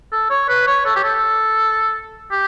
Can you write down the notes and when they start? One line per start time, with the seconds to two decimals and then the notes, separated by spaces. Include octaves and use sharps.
0.12 A4
0.30 C#5
0.49 B4
0.67 C#5
0.85 A4
0.96 G4
1.04 A4
2.32 G4